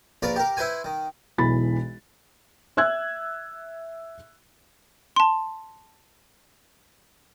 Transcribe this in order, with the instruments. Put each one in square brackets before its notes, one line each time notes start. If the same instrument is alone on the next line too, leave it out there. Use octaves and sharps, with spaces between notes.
[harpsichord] A#1 F4 A#4 B4 D5
G4 A#4
E4 B4 C5 G#5
D#3
[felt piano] E1 B1 E3 B5 A6
E5 E6 F#6 G#6
[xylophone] A5 C6